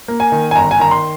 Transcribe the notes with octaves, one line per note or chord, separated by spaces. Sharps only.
A#3
G#5
D#3
G#5
G1 A#5
G#5
D#3 A#5
C6